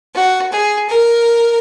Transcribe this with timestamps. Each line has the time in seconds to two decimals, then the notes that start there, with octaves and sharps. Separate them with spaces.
0.15 F#4
0.52 G#4
0.89 A#4